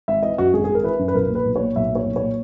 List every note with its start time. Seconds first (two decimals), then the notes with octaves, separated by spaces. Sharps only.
0.08 G#1 E5
0.23 E3 D#5
0.38 F#2 F#4
0.53 G#1 G#4
0.64 G#1 G#4
0.75 A#4
0.83 E3 B4
0.99 F#2
1.08 B4
1.14 B1 A#4
1.30 A#2
1.35 B4
1.45 B1
1.56 A#2 C#5
1.76 B1 E5
1.91 A#2 C#5
2.06 B1
2.16 C#5
2.21 A#2